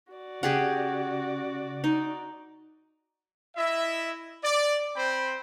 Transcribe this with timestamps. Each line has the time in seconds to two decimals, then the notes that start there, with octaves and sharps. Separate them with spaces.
0.13 F#4 D5
0.43 C#3 G4 G#4 F#5
1.84 D#4
3.56 E4 D#5 E5
4.43 D5
4.96 C4 C5 G5 B5